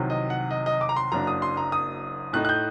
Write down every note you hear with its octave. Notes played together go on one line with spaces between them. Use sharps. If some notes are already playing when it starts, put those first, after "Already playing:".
Already playing: C2 C3 D#3 F#3
D#5
F#5
D#5
D#5
D6
A#5
C6
F#1 F#2 F#3 A#3 D4 A#5
D#6
C6
A#5
D#6
A2 A3 D#4 F#6
F#6
G6